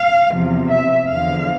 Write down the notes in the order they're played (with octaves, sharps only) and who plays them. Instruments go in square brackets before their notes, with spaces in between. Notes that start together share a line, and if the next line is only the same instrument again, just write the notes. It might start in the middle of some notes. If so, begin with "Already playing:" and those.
Already playing: [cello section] F5
E2 C3 F3
E5
E2 D3 F3 F5